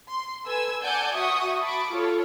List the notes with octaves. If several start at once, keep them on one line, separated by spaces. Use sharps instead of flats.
C6
A4 B4 G#5 E6
D5 F#5 G#5 A5 G6
F#4 E5 C#6 D#6
A5 B5 C#6 D6
F4 A4 C#5